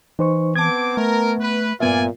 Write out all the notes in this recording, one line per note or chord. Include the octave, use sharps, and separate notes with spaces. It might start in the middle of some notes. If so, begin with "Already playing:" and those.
E3 D#4 C5 C#6
B3 C4 A5 D6 G#6
A3 A#4
B4
G2 A#2 B3 F4 D5 E5 G#5